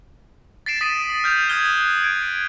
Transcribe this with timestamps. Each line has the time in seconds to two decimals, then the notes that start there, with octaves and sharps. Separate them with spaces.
0.66 A6 B6 C7 D7 E7
0.81 D#6 B6 D7 D#7
1.10 D#6
1.24 F6 G6 B6 F7
1.49 D#6 F#6 G#6 G7
2.02 G#6 D7